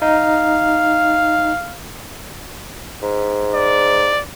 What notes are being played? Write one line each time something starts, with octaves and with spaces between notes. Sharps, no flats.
D#4 F5
G#2
D5